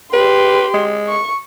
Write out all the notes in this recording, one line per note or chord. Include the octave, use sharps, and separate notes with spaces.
G4 B4 C6
G#3
C#6